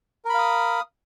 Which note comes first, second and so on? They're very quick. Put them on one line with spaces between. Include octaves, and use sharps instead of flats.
A#4 B5 F5 D#6